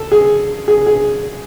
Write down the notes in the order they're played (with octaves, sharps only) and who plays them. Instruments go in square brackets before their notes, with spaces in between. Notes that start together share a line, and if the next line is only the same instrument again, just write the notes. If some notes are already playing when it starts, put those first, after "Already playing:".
Already playing: [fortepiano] A4
G#4
G#4
G#4